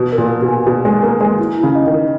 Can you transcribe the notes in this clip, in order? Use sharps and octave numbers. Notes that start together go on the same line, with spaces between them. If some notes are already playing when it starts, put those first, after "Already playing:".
Already playing: B2
A#4
A#2
A#4
B2
G#5
B2 G#5
G#3 G#5
A#3 A#4
G#3 G#5
E4
E4
C#3
D#5
D#3
A#4